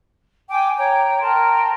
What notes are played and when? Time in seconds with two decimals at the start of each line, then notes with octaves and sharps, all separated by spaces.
0.49 G5 G#5 D6
0.77 C#5 G5 A#5
1.20 A#4 G5 A5 C6